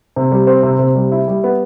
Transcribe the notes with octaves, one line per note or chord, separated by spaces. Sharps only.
C3
G3
C4
C3
C3
G3
E4
G3
B3